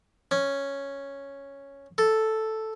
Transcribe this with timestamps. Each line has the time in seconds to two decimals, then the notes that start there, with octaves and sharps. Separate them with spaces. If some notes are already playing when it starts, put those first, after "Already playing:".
0.31 C#4
1.98 A4